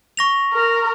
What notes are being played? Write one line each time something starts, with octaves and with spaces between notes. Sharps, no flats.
C#6 A#6 F7
A#4